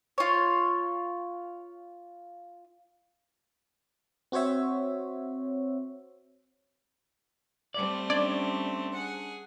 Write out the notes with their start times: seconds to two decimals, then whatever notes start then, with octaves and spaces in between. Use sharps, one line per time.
0.18 F4 C#5
4.32 C4 F#4 C5 C#5 E5
7.74 G3 A3 C4 D5
8.10 C#4 D4 D5
8.94 G#4 F#5